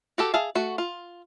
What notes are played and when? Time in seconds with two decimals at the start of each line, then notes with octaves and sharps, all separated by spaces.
0.18 F#4 G4 A4
0.34 G#4 E5 F5 A5
0.55 A3 F#4
0.78 F4